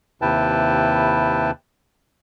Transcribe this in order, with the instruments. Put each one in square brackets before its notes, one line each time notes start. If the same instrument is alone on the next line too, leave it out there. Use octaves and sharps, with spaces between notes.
[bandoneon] D#2 C3 E4 B4 G5 A5